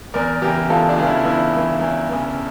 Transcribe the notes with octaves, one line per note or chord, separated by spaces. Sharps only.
E2 A#4 D5
C#3 E3 G4 A#4
E2 F4 A4
D4 F4
C#3 E3
E4
E2 E4
C#3 E3
E2
C#3 E3